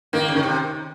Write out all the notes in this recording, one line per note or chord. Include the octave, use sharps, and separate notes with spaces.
D#3 A#3
C#3
D#3
C3